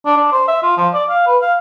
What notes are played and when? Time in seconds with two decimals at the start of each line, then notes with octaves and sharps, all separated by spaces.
0.06 D4
0.17 D4
0.32 C5
0.48 E5
0.62 F4
0.77 F3
0.94 D5
1.10 F5
1.27 B4
1.42 F5